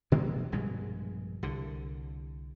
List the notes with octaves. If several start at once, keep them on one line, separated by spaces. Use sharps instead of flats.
B2 D#3 G#3 A#3
A#1 G2 B2 G#3
C2 D3